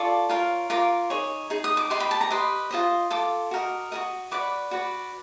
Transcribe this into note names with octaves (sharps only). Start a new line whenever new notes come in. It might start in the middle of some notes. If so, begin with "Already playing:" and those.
Already playing: F4 A4 D5 C#6
F4 A#4 C#5
F4 A#4 D6
D#4 G#4 C#5
D#4 G#4
D#6
D6
G4 B4 D#5 C6
B5
A5
A#5
G4 B4 D#5 C6
F4 A4 C5 D#5
F4 A4 D6
F#4 A#4 D#5
F#4 A#4 D#5 D#6
F#4 B4 D5 D6
F#4 B4 D5